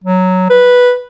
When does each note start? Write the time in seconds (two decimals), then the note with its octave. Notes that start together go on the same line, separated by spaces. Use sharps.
0.04 F#3
0.50 B4